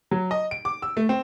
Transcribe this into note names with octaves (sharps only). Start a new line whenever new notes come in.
F#3
D#5
D7
D6
E6
A3
C4